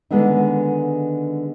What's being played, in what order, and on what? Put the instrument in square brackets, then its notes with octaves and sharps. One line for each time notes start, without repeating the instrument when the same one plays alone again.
[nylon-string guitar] D3 D#3 G#3 B3 C4 D#4